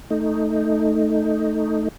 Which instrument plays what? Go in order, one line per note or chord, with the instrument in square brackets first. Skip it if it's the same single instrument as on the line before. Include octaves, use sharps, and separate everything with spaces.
[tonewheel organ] A3 D#4